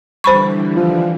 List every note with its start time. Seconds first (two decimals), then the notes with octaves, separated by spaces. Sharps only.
0.24 D3 E3 G3 C5 B5 C#6
0.76 F3